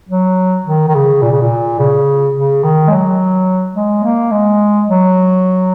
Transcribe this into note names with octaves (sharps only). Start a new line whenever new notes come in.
F#3
D#3
D#3
C#3
A#2
C#3
A#2
C#3
C#3
D#3
G#3
F#3
G#3
A#3
G#3
F#3